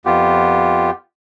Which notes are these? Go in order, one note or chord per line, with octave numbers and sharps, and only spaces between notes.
F2 B3 F4 G4